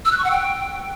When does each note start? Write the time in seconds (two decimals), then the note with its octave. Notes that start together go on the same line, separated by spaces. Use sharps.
0.05 E6
0.12 F#6
0.18 C#6
0.24 F#5
0.31 G5